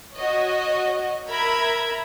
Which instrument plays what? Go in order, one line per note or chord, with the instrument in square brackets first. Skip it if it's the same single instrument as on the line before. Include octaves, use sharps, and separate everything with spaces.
[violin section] F#4 C#5 D#5
A#4 E5 A#5 B5 G#6